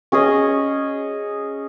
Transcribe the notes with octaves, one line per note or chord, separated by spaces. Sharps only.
C#4 G#4 D#5